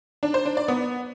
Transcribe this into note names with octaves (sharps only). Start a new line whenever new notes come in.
D4
C5
D4
D5
B3